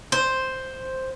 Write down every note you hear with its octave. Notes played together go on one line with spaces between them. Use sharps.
C5